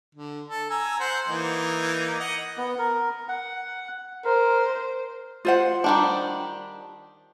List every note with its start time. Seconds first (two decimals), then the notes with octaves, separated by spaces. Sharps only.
0.15 D3
0.48 A4
0.70 G#5 A#5 E6
1.00 C5 F#5
1.28 E3 A#3 D#4
2.20 D#5 F#5
2.57 B3
2.79 A#4
3.28 F#5
4.25 A#4 C5
5.45 F4 C5 F#5
5.84 D#3 G3 D4